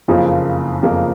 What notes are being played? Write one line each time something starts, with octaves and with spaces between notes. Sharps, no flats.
F#1 F2 C#3 F3 A#3
F#1 F2 C#3 F3 A#3